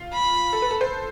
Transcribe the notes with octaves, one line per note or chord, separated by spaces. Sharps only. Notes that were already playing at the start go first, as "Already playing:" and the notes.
Already playing: F4
B5
A4
B4
A4
C5